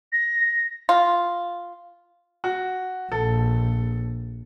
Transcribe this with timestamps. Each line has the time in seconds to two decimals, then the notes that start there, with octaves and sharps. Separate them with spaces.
0.12 A#6
0.89 F4
2.44 F#4
3.12 A#1 A4